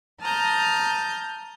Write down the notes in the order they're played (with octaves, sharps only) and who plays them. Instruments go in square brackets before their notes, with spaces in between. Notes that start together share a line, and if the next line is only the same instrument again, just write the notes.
[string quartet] A5 A#5 D#6 F6 G6